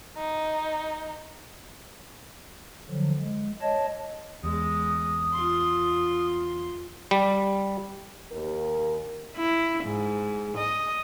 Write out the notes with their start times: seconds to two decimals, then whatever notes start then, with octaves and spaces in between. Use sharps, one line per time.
0.17 D#4
2.89 D3 F3 F#3
3.21 G#3
3.62 C#5 D#5 A5
4.44 E2 G#3 D#6
5.33 F4 C6
7.11 G3
8.32 D#2 A#4
9.36 E4
9.85 G#2
10.57 D#5